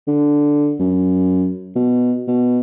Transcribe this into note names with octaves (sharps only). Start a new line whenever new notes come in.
D3
F#2
B2
B2